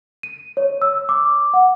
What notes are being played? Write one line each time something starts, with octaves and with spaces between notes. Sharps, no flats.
D#7
C#5
E6
D6
F#5